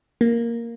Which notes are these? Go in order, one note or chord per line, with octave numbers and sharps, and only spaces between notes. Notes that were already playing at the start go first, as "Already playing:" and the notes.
A#3